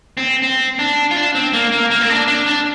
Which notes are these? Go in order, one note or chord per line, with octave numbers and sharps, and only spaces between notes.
C4
C4
D4
F4
D4
C4
A#3
A#3
A#3
C4
D4
D4
D4